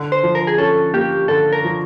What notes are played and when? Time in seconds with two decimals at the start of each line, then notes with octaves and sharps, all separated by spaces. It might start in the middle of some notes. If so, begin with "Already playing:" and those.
Already playing: D3
0.12 C5
0.23 F3
0.35 A#4
0.47 G#4
0.58 C#4 A4
0.94 A#3 G4
1.28 D3 A4
1.53 A#4
1.64 F3